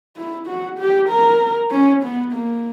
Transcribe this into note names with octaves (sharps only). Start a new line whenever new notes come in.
E4
F#4
G4
A#4
C#4
B3
A#3